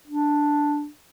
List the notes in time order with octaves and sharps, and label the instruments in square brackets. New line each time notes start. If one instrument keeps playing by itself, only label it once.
[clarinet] D4